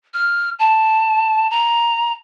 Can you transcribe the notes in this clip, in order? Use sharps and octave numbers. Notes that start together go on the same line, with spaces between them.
F6
A5
A#5